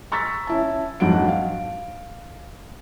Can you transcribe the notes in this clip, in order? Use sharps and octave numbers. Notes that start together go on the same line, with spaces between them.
A#5 C#6 E6 A6 B6
C#4 E4 A5
F2 G#2 F#3 D4 F#5 D7
F5